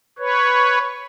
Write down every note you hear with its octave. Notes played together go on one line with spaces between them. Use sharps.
B4 C#5